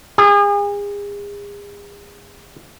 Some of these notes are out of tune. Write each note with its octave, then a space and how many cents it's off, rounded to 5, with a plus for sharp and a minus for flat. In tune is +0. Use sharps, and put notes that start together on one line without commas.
G#4 -35